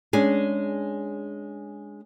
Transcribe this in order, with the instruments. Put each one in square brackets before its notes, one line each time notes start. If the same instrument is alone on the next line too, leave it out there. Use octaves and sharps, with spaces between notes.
[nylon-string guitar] G#3 C#4 D4 G#4